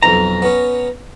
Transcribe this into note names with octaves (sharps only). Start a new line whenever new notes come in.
B1 F2 A#5
B3 C#4